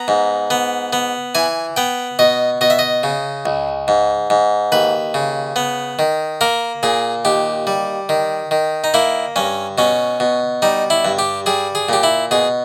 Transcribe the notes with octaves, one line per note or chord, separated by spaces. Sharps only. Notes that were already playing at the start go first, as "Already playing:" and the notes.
Already playing: B3 A#5
G#2
B3
B3
E3 G#5
B3 G5
B2 D#5
B2 D#5
E5
D#5
C#3
C#2
G#2
G#2
D#2 B4
C#3
B3
D#3
A#3 A#4
A#2 G#4
D#2 G4
G3
D#3
D#3
D#4
A#3 E4
G2 C#4
B2 C#4
B2
G3 D#4
E4
G2
G4
G3 G#4
G#4
A#2 G4
E4
B2 G#4